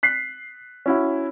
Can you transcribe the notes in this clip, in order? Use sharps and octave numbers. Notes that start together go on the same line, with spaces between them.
F#6 B6 C7
C#4 E4 F#4